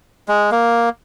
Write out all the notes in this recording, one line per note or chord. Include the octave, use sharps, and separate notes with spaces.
G#3
A#3